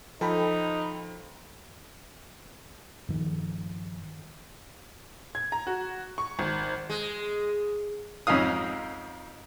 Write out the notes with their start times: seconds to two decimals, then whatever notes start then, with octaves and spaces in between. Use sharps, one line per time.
0.21 F3 D#4 A4 G5 B5
3.09 G2 D#3 F3
5.35 G#6
5.52 A#5
5.67 F#4
6.18 C#6
6.39 G#1
6.90 G#3
8.27 F2 G#2 C#4 F4 F5 D#6